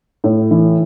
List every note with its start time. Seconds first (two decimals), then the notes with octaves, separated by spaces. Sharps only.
0.24 A2
0.51 E3